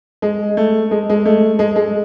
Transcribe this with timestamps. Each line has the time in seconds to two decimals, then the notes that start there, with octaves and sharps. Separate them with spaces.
0.22 G#3
0.57 A3
0.91 G#3
1.09 G#3
1.25 A3
1.59 G#3
1.76 G#3